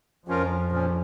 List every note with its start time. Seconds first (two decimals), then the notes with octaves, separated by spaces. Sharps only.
0.27 F2 F3 C#4 F4 A#4
0.71 A#2 F3 C#4